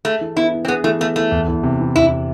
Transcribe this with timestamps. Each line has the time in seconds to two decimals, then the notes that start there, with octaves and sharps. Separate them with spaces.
0.05 A3 G#4
0.21 E3
0.36 B3 E4
0.52 E4
0.65 C4
0.68 B3 G#4
0.84 E3 A3
1.00 A3 B3
1.16 A3 E4
1.31 E2
1.48 E2
1.63 C3
1.80 E3
1.96 E2 E4